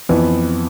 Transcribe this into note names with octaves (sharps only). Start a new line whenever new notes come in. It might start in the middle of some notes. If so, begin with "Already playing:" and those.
F2 E3 B3